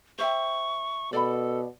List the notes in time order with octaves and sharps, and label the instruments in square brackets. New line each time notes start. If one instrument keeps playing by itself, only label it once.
[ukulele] C5 E5 G5 [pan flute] C#6
[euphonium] B2 [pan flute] A4 [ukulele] D5 B5